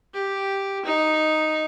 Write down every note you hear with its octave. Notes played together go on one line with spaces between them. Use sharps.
G4
D#4